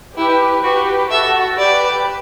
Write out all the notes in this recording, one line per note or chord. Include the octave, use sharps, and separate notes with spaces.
E4 G4 B4
F#4 G4 B4
F#4 A4 E5
G4 B4 D5